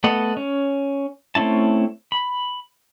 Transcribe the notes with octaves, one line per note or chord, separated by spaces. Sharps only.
A3 B3 A4 D#5 F#5
C#4
A3 C4 C#4 E4 A5
B5